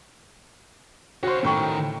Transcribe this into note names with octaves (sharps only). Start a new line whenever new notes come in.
F#4 C5 C#5 F5
F#2 A2 D#3 G5 C#6